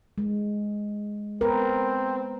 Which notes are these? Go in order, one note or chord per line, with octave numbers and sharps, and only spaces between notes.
G#3
B3 C4 A#4 B4